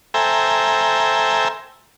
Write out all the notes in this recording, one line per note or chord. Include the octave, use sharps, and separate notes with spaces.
A4 C5 E5 G5 G#5 A#5